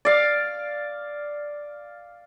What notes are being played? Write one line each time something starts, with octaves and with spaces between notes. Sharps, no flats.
D5 F5